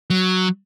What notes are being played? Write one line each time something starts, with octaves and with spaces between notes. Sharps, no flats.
F#3